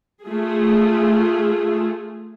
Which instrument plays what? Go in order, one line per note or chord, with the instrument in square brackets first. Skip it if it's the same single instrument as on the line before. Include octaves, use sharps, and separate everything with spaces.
[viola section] A3 F4 G#4